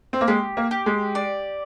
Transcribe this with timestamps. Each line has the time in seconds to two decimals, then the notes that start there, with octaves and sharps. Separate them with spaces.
0.13 C4
0.21 A#3
0.28 G#3 G4
0.57 A#3
0.71 G4
0.86 G#3
1.15 D5